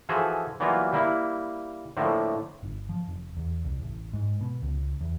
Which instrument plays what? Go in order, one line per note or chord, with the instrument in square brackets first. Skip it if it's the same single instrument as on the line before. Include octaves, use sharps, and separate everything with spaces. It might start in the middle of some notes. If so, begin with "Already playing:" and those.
[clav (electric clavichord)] E3 F3 F#4 G#4 A4 E5
E3 F#3 G3 A#3 B3 F4
G3 A#3 E4
A2 D3 F3 A3 A#3
[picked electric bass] G1
F3
F1
E2
C2
A1
G#2
B2
C#2
E2